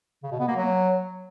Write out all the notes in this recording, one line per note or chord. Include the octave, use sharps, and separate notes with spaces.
C#3
B2
B3
A#3
F#3